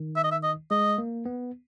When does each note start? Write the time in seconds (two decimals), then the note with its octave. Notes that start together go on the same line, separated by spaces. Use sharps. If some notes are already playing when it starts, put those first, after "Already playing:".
Already playing: D#3
0.16 E5
0.24 D#5
0.31 E5
0.43 D#5
0.71 G#3 D#5
0.98 A#3
1.25 B3